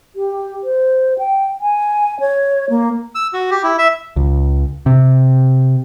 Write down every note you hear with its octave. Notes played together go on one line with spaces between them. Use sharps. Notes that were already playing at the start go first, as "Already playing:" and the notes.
G4
C5
G5
G#5
C#5
A#3
E6
F#4
G4
E4
E5
C#2
C3